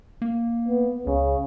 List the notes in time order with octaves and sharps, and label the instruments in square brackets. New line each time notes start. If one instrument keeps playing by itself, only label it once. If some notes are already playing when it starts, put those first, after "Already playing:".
[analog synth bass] A#3
[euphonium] B3
[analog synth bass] C#2 [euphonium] C#3